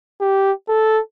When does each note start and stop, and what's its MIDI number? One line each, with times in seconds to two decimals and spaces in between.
0.21 0.52 67
0.68 1.00 69